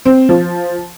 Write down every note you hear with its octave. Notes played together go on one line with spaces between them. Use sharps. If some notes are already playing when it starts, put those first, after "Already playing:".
C4
F3